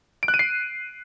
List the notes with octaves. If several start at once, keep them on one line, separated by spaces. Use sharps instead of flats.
D7
F#6
D#7
C7